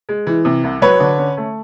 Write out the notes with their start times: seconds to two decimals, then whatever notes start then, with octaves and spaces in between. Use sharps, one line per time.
0.09 G#3
0.27 E3
0.45 C3
0.64 C2
0.82 F#3 B4 C#5
1.00 D3
1.18 C#4
1.37 A3